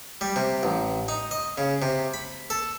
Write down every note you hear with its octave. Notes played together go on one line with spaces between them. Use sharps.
G3
C3
A1
D#4
D#5
C#3
C3
B5
A4